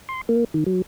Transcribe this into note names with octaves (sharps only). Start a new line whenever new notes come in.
C6
A#3
D#3
F#3